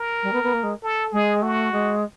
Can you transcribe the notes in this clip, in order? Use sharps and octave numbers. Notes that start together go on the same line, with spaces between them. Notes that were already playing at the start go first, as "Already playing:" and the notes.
Already playing: A#4
G3
B3
B3
A#3
G#3
A4
G#3 G#4
A3 F#4
G#3